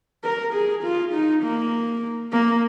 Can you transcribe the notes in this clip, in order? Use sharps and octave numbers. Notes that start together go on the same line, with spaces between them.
A#4
G#4
F4
D#4
A#3
A#3